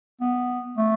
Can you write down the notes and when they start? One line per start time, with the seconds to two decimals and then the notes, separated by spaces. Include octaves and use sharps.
0.21 B3
0.77 A3